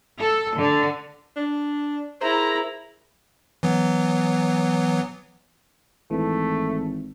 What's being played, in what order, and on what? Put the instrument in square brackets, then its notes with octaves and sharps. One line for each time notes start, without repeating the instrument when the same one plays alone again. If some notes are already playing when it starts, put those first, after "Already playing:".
[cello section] A4
D3
[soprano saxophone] D4
[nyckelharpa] E4 [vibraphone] G#4 A#4 E5 [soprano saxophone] C5 [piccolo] A#5
[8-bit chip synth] E3 F#3 B3
[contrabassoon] G#1 [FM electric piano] E3 [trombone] A3